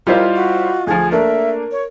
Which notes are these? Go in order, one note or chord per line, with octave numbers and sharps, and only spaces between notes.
G3 E4 F4 A#4 C5 D#5 F5
F#4
D2 F3 G#4
A3 A#3 D4 A#4 E5
C#5